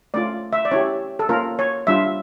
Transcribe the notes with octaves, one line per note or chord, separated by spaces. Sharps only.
A3 C#4 F4 D5
E5
D5
C#4 E4 G4 C#5
A4
A#3 C#4 F4 A#4
C#5
G3 D4 F4 E5